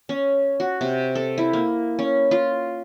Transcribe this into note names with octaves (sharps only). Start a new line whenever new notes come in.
C#4
F#4
C3
A4
E4
A#3
C#4
F4